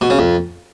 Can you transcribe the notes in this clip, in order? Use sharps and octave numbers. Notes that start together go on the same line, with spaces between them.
B2
C#3
F2